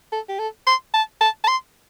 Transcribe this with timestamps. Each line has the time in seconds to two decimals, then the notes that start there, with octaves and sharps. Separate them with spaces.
0.12 A4
0.29 G4
0.39 A4
0.67 C6
0.94 A5
1.21 A5
1.44 A5
1.48 C6